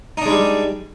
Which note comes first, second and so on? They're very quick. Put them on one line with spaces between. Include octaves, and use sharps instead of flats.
D#4 D4 G#3 G3